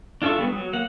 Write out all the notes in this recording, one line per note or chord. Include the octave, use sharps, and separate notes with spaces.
D4 F4 A4 E5 C#6
G3 A#3 B3
F#3
A#3 F#5